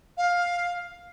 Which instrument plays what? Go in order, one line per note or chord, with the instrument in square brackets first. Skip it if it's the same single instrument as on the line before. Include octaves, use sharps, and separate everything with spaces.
[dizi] F5